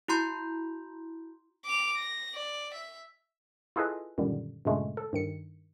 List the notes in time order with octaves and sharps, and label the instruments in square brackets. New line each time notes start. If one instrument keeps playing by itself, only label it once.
[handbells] E4 F#4 A#5 C6 G6
[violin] D6 F7
A#6
D5
E5
[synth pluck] E4 F4 G#4 A4 B4 D#5
F#2 A#2 D3 D#3 G3
G2 A#2 C#3 G#3 A3
A4
G2 D#3 C#7